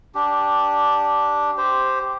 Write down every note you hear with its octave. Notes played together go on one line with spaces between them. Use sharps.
D4 G4
G4 C5